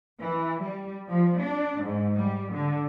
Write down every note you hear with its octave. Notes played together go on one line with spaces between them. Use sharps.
E3
G3
F3
D4
G#2
G3
D3